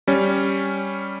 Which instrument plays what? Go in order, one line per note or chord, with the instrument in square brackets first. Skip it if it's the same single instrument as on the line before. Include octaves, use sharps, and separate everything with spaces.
[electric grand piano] G3 C#4